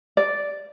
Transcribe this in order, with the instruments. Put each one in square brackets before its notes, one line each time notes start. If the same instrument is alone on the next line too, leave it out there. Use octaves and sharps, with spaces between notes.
[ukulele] D5